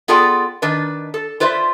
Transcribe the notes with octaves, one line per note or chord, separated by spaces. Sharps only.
B3 F4 G#4 A4 D5 G5
D#3 D4 B4
A4
F4 B4 C5 D5 E5